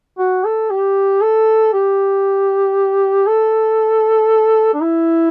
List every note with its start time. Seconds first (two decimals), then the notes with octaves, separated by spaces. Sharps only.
0.19 F#4
0.45 A4
0.70 G4
1.21 A4
1.73 G4
3.27 A4
4.74 D4
4.81 E4